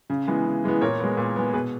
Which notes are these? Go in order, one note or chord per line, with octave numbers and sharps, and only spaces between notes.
C#3
E3 G#3 B3
C#3
E3 G#3 B3
A#2 A#4 C#5
G#3 B3
A#2
G#3 B3
B2 G#4 B4